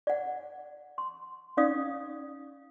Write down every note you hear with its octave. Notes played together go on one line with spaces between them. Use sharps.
D5 F#5
C6
C#4 D#4 D5 F5 D#6